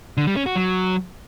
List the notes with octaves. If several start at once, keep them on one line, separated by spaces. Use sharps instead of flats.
D3
G3
C#4
F#4
F#3